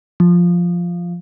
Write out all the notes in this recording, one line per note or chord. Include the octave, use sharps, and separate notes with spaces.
F3